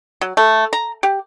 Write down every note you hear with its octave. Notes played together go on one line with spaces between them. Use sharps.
F#3
A3
A#5
G4